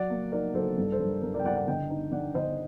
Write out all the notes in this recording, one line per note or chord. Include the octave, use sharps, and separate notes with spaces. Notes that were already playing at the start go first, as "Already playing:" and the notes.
Already playing: F#3 D5 F#5
A#3
D#4 A#4 D5
F#3 A4 C5
G2 A4
A4 C5
G2
A#4
G2 A#4
A#4 D5
G5
G2 D5 F#5
D5 F#5
D3 D#5 G5
D#4
D3 D5 F#5
D3 C5 D#5